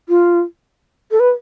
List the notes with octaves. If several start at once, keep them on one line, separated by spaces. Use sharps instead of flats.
F4
A4
B4